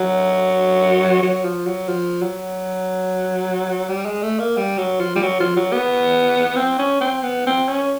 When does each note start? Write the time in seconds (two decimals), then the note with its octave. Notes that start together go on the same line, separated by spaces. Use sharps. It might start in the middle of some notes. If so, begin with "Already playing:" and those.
Already playing: F#3
1.23 F#3
1.44 F3
1.67 F#3
1.88 F3
2.22 F#3
3.89 G3
4.06 G#3
4.23 A3
4.40 A#3
4.57 G3
4.78 F#3
5.00 F3
5.15 G3
5.23 F#3
5.40 F3
5.57 F#3
5.73 B3
6.57 C4
6.79 C#4
7.01 C4
7.23 B3
7.47 C4
7.69 C#4